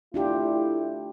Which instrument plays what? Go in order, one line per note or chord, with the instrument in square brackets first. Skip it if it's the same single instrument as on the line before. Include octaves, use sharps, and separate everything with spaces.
[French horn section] A3 E4 [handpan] D4 F4 G4